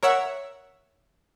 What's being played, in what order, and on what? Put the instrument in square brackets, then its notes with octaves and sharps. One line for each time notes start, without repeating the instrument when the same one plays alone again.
[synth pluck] A#4 C#5 E5 F#5